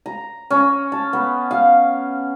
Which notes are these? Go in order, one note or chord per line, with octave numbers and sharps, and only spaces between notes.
A#5
C#4
A5
B3
F5